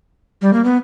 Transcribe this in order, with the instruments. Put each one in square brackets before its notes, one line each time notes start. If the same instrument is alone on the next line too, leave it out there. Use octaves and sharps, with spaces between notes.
[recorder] G3
A#3
B3